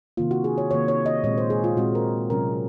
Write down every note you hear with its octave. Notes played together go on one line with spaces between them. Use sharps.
C3 D#3 A#3 F4
F#4
G#4
C#5
C3 D#3 A#3 C#5
C#5
D#5
A#2 G#3 C4 C#5
C5
G#4
F4
A#2 G#3 C4 F#4
A#4
C3 F#3 C#4 A#4